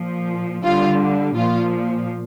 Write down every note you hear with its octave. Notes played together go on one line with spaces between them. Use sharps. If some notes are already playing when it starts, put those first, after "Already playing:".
Already playing: A#2 F3
D3 G3 F4
A#2 F3 F4